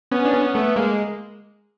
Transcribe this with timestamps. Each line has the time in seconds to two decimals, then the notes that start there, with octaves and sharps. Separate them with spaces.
0.11 B3 C#4
0.25 D4
0.33 B3 C#4
0.55 A3 B3
0.76 G#3 A#3